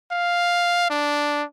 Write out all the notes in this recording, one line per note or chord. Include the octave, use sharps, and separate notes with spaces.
F5
D4